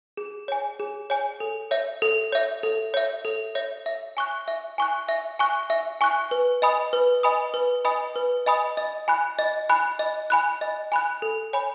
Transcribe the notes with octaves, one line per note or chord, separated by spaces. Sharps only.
G#4
C#5 G#5
G#4
C#5 G#5
A4
C#5 E5
A4
C#5 E5
A4
C#5 E5
A4
C#5 E5
E5
G#5 C#6 F#6
E5
G#5 C#6 F#6
E5
G#5 C#6 F#6
E5
G#5 C#6 F#6
B4
D#5 G#5 B5 D#6
B4
D#5 G#5 B5 D#6
B4
D#5 G#5 B5 D#6
B4
D#5 G#5 B5 D#6
D#5
G#5 B5 F#6
D#5
G#5 B5 F#6
D#5
G#5 B5 F#6
D#5
G#5 B5 F#6
A4
C#5 G#5 B5